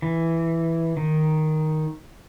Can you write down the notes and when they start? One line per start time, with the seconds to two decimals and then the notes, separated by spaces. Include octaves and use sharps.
0.02 E3
0.97 D#3